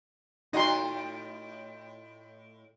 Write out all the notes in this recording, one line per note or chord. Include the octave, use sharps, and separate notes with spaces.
A2 D#4 F4 F#4 D#5 C6